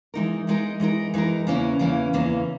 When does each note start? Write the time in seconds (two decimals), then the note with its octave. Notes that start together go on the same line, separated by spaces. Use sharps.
0.14 E3 G#3 D#4 A#4
0.47 E3 G#3 D#4 A#4
0.80 E3 G#3 D#4 A#4
1.14 E3 G#3 D#4 A#4
1.47 E2 C#3 E3 A#3 C#4
1.79 E2 C#3 E3 A#3 C#4
2.13 E2 C#3 E3 A#3 C#4